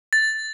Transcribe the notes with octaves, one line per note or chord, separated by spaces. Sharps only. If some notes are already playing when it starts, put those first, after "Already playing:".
A6